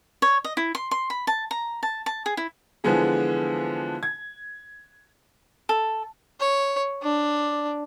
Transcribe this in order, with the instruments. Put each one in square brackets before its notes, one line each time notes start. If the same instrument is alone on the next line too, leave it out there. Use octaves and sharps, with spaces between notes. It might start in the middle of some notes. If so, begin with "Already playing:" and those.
[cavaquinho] C#5
D#5
E4
C6
C6
B5
A5
A#5
A5
A5
G#4
E4
[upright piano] D3 E3 F3 G#3 B3 G#4
G#6
[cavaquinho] A4
[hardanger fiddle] C#5
D4